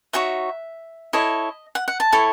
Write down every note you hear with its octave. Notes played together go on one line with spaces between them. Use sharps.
D#4 F#4 C#5 E5
E4 A4 C#5 D#5
F#5
F#5
A5
E4 A4 C#5 B5